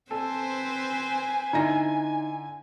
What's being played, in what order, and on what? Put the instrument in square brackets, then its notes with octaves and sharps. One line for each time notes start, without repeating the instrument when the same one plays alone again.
[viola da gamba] C4 B4 C5 [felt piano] A4 [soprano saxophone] G#5
[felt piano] D3 E4 A#6 [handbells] D#4